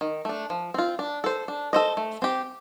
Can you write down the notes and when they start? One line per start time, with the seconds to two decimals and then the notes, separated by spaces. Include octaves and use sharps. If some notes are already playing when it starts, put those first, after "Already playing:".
0.01 D#3
0.25 A3 D4
0.50 F3
0.74 C4 F4
0.99 D4
1.24 A4 C5
1.48 D4
1.73 A4 C5 D#5
1.97 A3
2.22 C4 G4